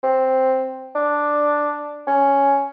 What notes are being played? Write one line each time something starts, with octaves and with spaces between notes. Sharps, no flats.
C4
D4
C#4